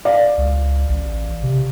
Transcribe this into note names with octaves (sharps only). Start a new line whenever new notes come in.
D5 F5
C#2
A1
C3